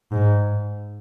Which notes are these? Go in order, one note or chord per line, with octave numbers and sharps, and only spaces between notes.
G#2